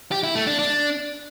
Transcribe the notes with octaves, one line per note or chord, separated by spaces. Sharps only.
G4
E4
A3
D4
D4